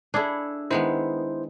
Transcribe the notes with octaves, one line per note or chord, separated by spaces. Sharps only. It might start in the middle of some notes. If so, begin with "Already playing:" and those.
D4 E4 G#4 A4
D#3 G#3 B3 E4 C5